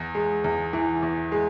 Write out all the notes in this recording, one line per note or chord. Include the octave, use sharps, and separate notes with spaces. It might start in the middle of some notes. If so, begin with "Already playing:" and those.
Already playing: E2
G#3
E2
E3
E2
G#3